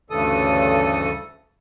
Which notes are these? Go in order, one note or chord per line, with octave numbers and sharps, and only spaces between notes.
D2 G2 C#3 E3 A4 D#6